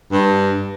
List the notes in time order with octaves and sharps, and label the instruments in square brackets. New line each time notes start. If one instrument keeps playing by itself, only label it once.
[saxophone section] G2